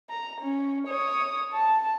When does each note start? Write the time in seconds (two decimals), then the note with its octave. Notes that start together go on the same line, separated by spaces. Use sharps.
0.10 A#5
0.41 C#4
0.87 C#5 D#6
1.54 A5